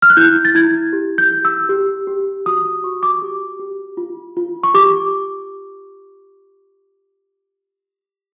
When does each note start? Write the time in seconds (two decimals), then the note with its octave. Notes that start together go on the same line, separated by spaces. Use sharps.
0.02 F6
0.10 F#6
0.17 E4 G6
0.45 A6
0.55 E4 G#6
0.93 G4
1.18 G6
1.32 G4
1.45 E6
1.69 G4
2.07 G4
2.46 F#4 D#6
2.84 F#4 C#6
3.03 D6
3.22 G4
3.60 G4
3.97 F4
4.37 F4
4.63 C#6
4.74 G4 D6